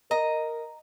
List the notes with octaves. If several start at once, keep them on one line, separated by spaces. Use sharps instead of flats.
A#4 D#5 A#5